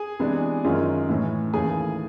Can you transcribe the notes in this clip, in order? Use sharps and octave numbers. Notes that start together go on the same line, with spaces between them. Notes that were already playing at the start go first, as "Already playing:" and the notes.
Already playing: G#4 G#5
C3 E3 G#3 B3 D4
F#2 D#3 G#3 C#4 F4
A2 E3 A3 C#4
D#2 C#3 E3 A3 C#4 G#4 G#5